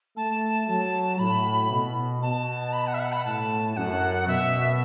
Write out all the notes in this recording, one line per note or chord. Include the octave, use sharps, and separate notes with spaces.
A3 A5
F#3 A5
A2 B5
B2
B2 A5
B5
F#5
E5
F#5
B5
A2 A5
F#2 F#5
B2 E5